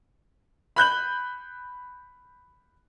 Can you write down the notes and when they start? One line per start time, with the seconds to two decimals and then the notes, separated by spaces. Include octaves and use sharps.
0.76 B5 F#6 G6 F#7